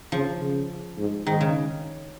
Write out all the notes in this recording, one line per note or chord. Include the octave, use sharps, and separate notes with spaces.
C#3 F3
C#3
G#2
G#2 D#3
C#3